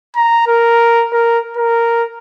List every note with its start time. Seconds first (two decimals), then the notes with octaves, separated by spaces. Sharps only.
0.16 A#5
0.47 A#4
1.12 A#4
1.57 A#4